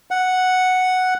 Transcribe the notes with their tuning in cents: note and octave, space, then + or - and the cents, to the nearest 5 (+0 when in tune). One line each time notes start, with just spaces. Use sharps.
F#5 +0